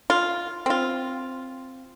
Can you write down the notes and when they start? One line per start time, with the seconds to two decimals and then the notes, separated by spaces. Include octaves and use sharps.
0.10 F4
0.66 C4 F4